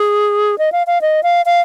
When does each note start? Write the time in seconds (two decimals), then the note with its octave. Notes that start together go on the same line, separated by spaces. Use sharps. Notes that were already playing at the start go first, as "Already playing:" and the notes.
Already playing: G#4
0.58 D#5
0.72 F5
0.87 F5
1.01 D#5
1.23 F5
1.46 F5